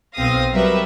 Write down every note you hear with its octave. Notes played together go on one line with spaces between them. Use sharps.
B1 C4 F5 D#6 A#6
F#3 G3 A#4 B4 E5